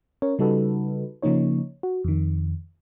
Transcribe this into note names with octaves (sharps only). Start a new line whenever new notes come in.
C#4 A#4 C#5
C#3 G3 D#4 F#4 A4 B4
C#3 F3 A#3 D#4 C#5
F#4
F2 D#3